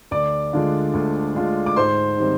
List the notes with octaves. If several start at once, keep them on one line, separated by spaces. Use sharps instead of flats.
D2 D5 D6
D3 G#3 D4 F4
D2
D3 G#3 D4 F4
D6
G#2 C5 C6
D#3 G3 C4